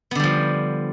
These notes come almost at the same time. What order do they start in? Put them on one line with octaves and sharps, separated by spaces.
B3 D3 G3 F3